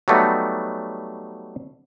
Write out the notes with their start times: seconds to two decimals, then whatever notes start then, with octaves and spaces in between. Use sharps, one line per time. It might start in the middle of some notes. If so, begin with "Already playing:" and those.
0.08 F#3 G3 A3 B3 D#4